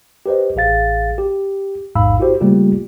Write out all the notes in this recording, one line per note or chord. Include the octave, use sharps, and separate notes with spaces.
G4 B4 C5 D#5
A1 G#4 F5 A6
G4
A1 E2 G#2 F5 B5 E6
E4 F#4 G4 C5
C#3 G3 A3 A#3 F4 G4